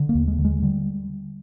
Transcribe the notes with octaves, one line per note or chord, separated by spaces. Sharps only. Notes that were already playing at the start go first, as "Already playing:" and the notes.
Already playing: D3
A#3
D#2
G#3
D3
G#3
D3 G3